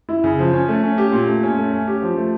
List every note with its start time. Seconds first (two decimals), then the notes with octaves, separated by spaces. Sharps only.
0.09 E4
0.24 C#3
0.39 F3
0.53 C#4
0.68 A3
0.83 C#4
0.98 G4
1.12 A#2
1.27 A3
1.43 C#4
1.58 A3
1.73 C#4
1.88 G4
2.02 F3
2.17 A3